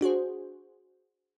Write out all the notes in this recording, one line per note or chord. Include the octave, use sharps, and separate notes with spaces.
D4 F#4 G#4 C5